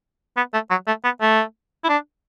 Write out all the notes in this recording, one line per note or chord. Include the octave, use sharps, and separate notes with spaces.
B3
A3
F#3
A3
B3
A3
E4
D4